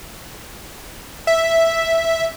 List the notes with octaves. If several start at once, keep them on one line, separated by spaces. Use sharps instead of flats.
E5